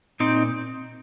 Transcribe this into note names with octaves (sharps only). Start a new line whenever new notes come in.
A#2 C4 D#4